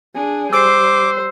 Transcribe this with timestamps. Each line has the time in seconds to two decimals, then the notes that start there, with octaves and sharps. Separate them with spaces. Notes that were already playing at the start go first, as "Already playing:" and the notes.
0.14 D4 G#4
0.53 G3 C5 D6 E6 C7